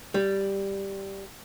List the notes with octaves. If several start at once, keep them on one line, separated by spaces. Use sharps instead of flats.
G3